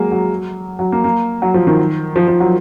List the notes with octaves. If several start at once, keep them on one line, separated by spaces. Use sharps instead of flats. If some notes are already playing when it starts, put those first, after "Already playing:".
Already playing: F#3 G#3 A#3
F#3
F#3
A#3
A#3
F#3
F3
D#3
F3
F3
F#3